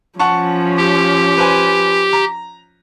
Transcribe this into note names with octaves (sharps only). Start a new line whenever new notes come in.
F3 C#4 F#5 A5 C#6
G4
B4 C5 G#5
A#5